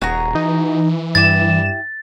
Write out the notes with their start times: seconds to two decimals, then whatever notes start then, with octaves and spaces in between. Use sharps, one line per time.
0.02 D#1 F#4 G#4 A#5
0.35 E3 D#4
1.15 G2 E4 G4 A6 E7